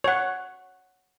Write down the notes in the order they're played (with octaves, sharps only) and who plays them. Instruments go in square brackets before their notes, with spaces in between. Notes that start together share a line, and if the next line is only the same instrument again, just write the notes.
[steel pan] C#5 F#5